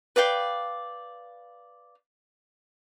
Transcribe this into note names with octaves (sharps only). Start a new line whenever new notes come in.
B4 D5 F5 G5